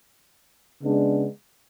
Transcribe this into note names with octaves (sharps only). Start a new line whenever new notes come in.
C#3 G#3 B3 D4